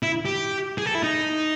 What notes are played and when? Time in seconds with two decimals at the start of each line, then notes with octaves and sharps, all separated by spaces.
0.03 E4
0.25 G4
0.78 G#4
0.86 A4
0.95 E4
1.03 D#4